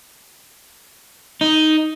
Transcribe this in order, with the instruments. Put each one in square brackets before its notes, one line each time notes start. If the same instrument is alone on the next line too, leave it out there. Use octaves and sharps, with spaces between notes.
[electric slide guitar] D#4